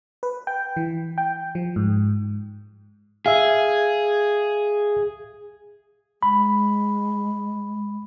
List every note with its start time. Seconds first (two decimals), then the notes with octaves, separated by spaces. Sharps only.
0.23 B4
0.47 G5
0.77 E3
1.18 G5
1.55 F3
1.76 G#2
3.26 G#4 E5 F5
6.23 G#3 B5